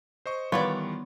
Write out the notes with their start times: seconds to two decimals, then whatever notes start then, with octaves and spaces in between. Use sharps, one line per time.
0.26 C5 D#5 C#6
0.52 D#3 E3 G3 B3 F4 B4 C#5 D5